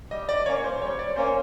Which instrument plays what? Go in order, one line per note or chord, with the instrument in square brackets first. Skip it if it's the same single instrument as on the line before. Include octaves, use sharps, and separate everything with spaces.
[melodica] G3 [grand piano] D#5
[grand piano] D5
[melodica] A#3 C#4 [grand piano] C#5
[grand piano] C5
[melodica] G3 [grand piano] C#5
[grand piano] D5
[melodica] A#3 C#4 [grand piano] C5